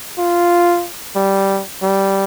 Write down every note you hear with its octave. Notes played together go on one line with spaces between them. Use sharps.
F4
G3
G3